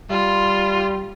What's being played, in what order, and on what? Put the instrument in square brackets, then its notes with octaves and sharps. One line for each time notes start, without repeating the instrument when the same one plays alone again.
[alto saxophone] G3 [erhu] F4